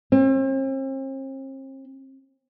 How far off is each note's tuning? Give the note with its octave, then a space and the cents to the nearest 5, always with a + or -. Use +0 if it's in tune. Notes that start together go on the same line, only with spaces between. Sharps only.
C4 +45